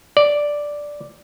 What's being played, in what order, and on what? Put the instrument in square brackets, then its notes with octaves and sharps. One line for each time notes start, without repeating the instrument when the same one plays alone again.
[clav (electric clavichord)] D5